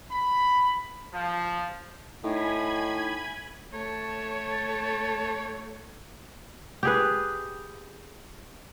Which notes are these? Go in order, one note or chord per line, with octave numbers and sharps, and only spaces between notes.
B5
F3
A2 D#4 G#5 B5 G#6
A3 C#5 A5
G4 G#4 B4